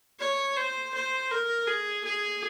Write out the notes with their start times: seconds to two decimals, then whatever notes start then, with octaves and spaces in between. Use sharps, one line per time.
0.20 C#5
0.57 C5
0.95 C5
1.31 A#4
1.68 G#4
2.05 G#4